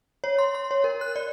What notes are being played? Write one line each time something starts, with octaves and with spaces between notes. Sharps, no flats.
C#5
C6
C6
C#5
A#4
F#6
D5